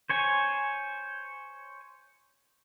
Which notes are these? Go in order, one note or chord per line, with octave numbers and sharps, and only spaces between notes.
C5 C#5 G#5